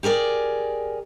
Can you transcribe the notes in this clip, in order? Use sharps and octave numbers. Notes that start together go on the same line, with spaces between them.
G4 G#4 A#4 D5